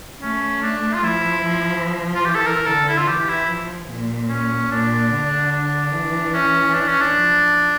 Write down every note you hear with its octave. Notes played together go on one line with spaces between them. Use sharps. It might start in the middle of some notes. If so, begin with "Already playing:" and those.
A3 C#4
D4
F4
F3 E4
F3
F4
E3 G4
A4
A#4
D3 A4
E4
F4
E3 G4
E4
F3
A#2
C#4
A#2 D4
D3
D4
E3
C#4
D4
C#4
D4
F3